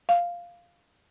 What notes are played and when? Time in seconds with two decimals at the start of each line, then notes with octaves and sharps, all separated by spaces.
0.09 F5